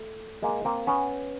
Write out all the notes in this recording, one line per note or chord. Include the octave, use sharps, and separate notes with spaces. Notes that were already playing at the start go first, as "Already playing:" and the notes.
Already playing: A3
G#3 A#3
A#3 C4
B3 C#4